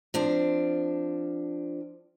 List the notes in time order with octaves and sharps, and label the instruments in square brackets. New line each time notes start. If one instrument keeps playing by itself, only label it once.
[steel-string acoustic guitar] F3 C4 D4